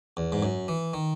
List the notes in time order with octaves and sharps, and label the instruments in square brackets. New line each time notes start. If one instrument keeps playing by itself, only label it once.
[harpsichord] E2
G#2
F#2
E3
D#3